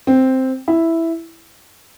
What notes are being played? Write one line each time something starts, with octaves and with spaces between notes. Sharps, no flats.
C4
E4